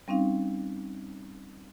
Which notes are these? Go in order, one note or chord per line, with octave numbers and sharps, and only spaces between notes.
G3 C4 C#4 D#4 F5